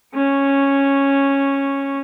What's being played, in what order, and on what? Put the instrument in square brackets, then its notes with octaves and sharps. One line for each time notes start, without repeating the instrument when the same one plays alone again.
[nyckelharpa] C#4 C#6